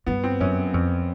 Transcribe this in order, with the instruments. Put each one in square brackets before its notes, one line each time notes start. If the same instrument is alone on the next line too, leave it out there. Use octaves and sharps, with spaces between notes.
[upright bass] G2 [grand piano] B3
[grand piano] C4
[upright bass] F#2 [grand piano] C#4
[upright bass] F2